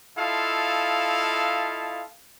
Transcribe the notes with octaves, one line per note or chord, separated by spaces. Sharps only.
E4 F4 A4 D#5 F5 A5